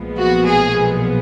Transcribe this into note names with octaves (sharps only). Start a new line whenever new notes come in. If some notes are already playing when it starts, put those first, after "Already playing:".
Already playing: B1 A#2 F3 G#3 B3
F#4
G#4